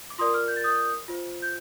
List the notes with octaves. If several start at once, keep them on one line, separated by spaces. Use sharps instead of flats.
D6
F4 A#4 D5 C6 D#6
D6 F6
G6
A6
D#6 G6
F4 C5
G6